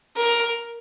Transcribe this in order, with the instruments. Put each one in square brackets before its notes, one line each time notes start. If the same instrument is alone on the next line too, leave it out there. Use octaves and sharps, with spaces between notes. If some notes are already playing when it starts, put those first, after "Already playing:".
[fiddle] A#4